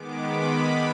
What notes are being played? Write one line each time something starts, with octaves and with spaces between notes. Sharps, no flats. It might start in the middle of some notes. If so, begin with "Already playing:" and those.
Already playing: D#3 G#3 B3 D6
B5